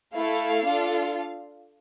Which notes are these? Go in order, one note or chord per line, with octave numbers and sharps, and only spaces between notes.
A3 E4 A4 F5
D4 F4 A4